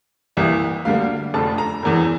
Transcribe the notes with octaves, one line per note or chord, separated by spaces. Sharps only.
C2 C3 E3 A#3 E5
D2 D3 G3 A#3 F5
F1 F2 D3 A3 A5
A#5
E1 E2 E3